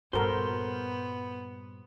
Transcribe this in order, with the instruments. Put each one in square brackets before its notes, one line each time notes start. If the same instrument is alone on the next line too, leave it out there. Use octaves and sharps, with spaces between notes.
[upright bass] G2 A#2 [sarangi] B3 [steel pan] F#4 A4 A#4 [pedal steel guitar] C5 C6